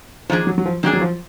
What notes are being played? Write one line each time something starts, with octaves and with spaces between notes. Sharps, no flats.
D#3 F3 A#3 D4 G#4
F#3
F#3
F3
D#3 F#3 A#3 D4 G#4
F#3
F3